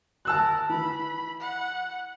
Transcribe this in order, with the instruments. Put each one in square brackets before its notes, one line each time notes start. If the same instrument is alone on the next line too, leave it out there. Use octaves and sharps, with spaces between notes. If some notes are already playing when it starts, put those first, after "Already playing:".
[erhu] A#4 [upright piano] A5 E6 F#6
[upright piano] E3 [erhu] B5
[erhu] F#5